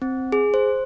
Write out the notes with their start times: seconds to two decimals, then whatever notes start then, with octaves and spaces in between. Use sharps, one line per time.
0.02 C4
0.32 G#4
0.54 C5